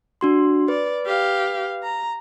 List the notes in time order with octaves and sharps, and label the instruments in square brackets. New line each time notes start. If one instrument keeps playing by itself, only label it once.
[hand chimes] D4 F#4 C6
[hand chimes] B4 [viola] D5
[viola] G4 F5
A#5